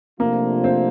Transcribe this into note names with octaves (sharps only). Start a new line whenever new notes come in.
C3 F3 A3 A#3 D4 F4
C4